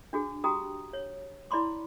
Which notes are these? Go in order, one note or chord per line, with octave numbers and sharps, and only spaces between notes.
D4 F#4 G#4
F#4 G4 G5 A#5 D#6
C#5
E4 D5 B5 C6 D6